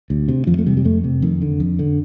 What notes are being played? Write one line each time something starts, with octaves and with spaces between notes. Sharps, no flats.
D2
C3
F2 F3
A3
C3 G3
G3
F2 A3
C3
F2 D#3
D3
F2
D3